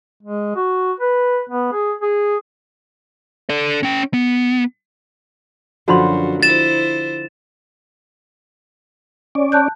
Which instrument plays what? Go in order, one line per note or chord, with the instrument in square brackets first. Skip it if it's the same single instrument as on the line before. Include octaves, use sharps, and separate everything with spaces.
[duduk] G#3
F#4
B4
B3
G#4
G#4
[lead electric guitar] A4 D5
C#4 G5
B3
[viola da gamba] F#2 [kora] D3 F3 [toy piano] F#4 B5 C6
[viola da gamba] E4 C5 [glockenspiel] A6 E7
[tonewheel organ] C#4 D5
[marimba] A5 F#6 G6